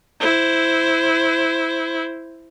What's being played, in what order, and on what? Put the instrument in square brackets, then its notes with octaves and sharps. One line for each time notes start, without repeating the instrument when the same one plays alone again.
[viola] E4 C5